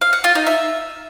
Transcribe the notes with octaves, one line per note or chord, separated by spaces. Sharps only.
F5
F#5
F4
D#4
E5